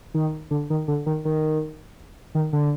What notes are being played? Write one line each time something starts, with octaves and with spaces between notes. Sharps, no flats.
D#3
D3
D#3
D3
D#3
D#3
D#3
D3